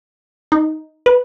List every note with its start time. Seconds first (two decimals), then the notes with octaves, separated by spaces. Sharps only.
0.52 D#4
1.06 B4